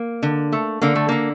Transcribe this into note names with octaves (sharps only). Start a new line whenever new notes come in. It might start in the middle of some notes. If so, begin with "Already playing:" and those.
Already playing: A#3
D3
A3
D3 A#3
A3
D3 A#3